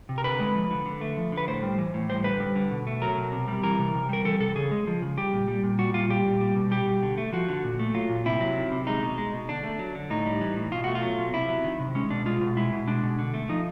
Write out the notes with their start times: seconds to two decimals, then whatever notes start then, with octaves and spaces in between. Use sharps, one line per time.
0.09 C3
0.18 A#4
0.24 D3 B4
0.40 G#3
0.55 F3
0.71 D3
0.86 D3
1.01 A3
1.17 F3
1.32 D3
1.37 B4
1.47 A2 C5
1.63 G3
1.78 E3
1.94 A2
2.09 G3 C5
2.24 D3 B4
2.40 G3
2.56 D3
2.71 B2
2.87 A3
3.02 F#3 A#4
3.17 B2
3.32 C3
3.48 G3
3.63 E3 A#4
3.79 C3
3.94 C3
4.09 G3 A#4
4.25 E3 A4
4.40 C3 A4
4.56 C#3 G#4
4.71 G#3
4.87 F3
5.02 C#3
5.17 G3 G4
5.33 A#2
5.48 G3
5.64 A#2
5.79 G3 F#4
5.94 A#2 F4
6.10 G3 G4
6.25 A#2
6.41 G3
6.56 B2
6.71 G3 G4
6.87 B2
7.03 D3
7.18 A3
7.33 F3 F#4
7.49 D3
7.64 A#2
7.79 A3
7.94 F#3 F4
8.09 A#2
8.25 C3 E4
8.41 F#3
8.56 D#3
8.72 C3
8.87 G#3 D#4
9.02 B2
9.18 G#3
9.33 B2
9.49 D3 D4
9.64 A3
9.79 F#3
9.95 D3
10.10 A2 D#4
10.26 G3
10.41 E3
10.57 A2
10.72 B2 F4
10.84 A3 F#4
10.95 F4
11.03 F#3
11.18 B2
11.33 C3 E4
11.49 F#3
11.64 D#3
11.80 C3
11.95 G#3 C#4
12.10 B2 D4
12.26 G#3 F4
12.41 B2
12.57 G#3 E4
12.72 B2
12.88 G#3 D4
13.03 B2
13.19 D3
13.34 A3
13.49 F3 D#4